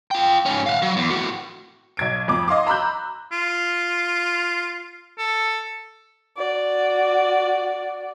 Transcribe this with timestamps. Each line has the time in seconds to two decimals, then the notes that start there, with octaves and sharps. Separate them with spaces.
0.11 F4 G5
0.46 G#2 C#4
0.66 F5 F#5
0.82 F#3
0.97 E2
1.10 A2 F#4
1.97 B1 G#6 D7
2.28 F2 D6
2.48 D#5 F5 C6 D6
2.67 A#5 B5 E6 F#6 G6
3.32 F4
5.19 A4
6.37 F#4 D5